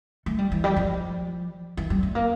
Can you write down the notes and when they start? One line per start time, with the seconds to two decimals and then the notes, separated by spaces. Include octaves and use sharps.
0.26 A3
0.38 G3
0.52 E3
0.64 G3
0.76 F3
1.77 E3
1.90 G3
2.03 A3
2.15 A#3